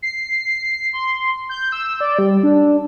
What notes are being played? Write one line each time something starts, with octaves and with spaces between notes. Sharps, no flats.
C7
C6
G6
E6
D5
G3
D4